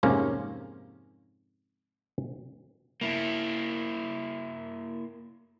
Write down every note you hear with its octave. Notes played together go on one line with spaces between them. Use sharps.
F2 G#2 C3 A#3 C#4
A#3 E4